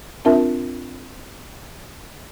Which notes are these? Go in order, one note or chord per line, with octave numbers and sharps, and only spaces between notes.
C4 D4 F4 A#4 E5 A5